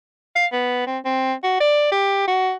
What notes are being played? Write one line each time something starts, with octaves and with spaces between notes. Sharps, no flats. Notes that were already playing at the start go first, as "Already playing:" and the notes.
F5
B3
C4
C4
F#4
D5
G4
F#4